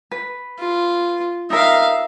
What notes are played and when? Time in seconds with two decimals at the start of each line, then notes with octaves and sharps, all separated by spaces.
0.11 B4
0.58 F4
1.50 D#4 A#4 E5 F5